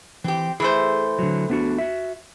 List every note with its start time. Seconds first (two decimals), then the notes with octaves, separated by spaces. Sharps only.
0.24 E3 C4 G4
0.60 E3 A3 G#4 C5
1.19 D3 F#3
1.50 B3 D4 F#4
1.78 F#4 E5